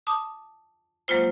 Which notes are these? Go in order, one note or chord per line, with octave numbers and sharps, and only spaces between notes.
A5 D6 D#6
F#3 G#3 A#3 F4 C5